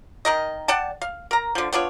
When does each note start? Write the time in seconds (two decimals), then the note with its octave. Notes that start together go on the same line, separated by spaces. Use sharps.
0.25 D#3 A#4 D#5
0.68 D5 F#5 G5 A5
1.02 F5
1.31 A#4 A#5
1.55 D3 F3
1.73 B3 D4 F4 C#5